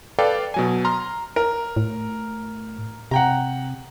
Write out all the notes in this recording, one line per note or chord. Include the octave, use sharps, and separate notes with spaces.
A4 B4 D5 F5 G5
B2 F#3 G#5
A#5 C6 F6
A#4
A2
C3 F#5 G5 A#5